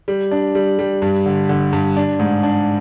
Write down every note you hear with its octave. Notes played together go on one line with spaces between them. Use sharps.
G3
D4
G3
G3
G2
D3
D3
G2
D4
G#2
D4